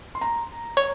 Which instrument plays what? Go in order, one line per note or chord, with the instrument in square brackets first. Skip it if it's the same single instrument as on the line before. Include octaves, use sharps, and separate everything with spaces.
[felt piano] C6
A#5
[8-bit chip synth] C#5